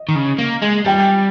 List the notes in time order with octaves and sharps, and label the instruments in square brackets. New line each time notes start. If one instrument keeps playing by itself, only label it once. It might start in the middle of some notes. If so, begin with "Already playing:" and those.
Already playing: [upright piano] D#5
[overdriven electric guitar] D#3
C#3
A#3
G#3
[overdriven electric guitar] G3 [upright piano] G5